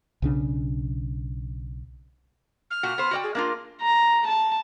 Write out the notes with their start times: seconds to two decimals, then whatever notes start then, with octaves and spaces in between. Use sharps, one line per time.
0.22 B1 C#3 D4
2.71 F6
2.83 A#2 F#4
2.98 B3 C5
3.11 F#4 D5 G5
3.23 G#4
3.35 A#3 D4 F4 A#4
3.81 A#5
4.26 A5